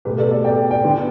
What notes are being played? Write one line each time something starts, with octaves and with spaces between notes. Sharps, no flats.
B2 A3 G4 B4
A4 D5
A4 D5
D5 G5
D5 G5
D3 B3